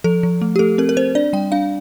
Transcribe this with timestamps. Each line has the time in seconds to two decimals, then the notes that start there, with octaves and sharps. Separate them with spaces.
0.04 F3 A4
0.23 F3
0.41 A3
0.56 G4
0.59 A3 A4
0.78 C4 A#4
0.89 A#4
0.97 C4 C5
1.15 D4 D5
1.33 G3 G5
1.52 D4 F5